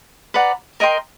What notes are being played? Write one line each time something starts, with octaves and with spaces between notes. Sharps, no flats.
B4 D5 F#5 A#5
A#4 D#5 G5 C6